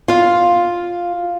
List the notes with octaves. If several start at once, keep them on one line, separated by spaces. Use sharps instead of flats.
F4 F5